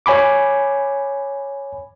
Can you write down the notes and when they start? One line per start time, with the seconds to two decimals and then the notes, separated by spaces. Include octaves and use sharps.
0.06 C#5 G#5 B5 D6